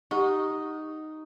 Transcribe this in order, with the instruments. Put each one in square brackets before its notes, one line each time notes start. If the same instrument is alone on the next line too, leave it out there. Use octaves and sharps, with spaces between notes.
[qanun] D#4 [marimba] G4 F#5 C#6